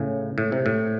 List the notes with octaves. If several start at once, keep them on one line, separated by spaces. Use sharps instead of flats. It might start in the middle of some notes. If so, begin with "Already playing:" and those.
Already playing: A2 C#3
A2
C3
A2